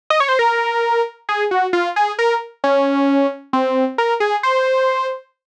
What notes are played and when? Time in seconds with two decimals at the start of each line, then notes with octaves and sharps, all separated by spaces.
0.10 D#5
0.20 C#5
0.29 C5
0.39 A#4
1.29 G#4
1.51 F#4
1.73 F4
1.96 G#4
2.19 A#4
2.64 C#4
3.53 C4
3.98 A#4
4.20 G#4
4.43 C5